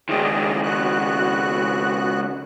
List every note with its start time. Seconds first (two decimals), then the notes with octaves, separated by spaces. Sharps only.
0.09 C#2 D#3 G#4 D5 D#5
0.63 B3 F#4 F#6